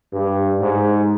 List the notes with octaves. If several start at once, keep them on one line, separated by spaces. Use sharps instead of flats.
G2
G#2